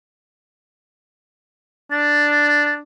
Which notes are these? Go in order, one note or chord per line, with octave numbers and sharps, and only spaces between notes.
D4 A6